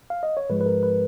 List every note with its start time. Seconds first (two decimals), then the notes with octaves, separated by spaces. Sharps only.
0.10 F5
0.23 D#5
0.37 C#5
0.50 G#2 F3 G#3 B4
0.61 B4
0.66 A#4
0.83 B4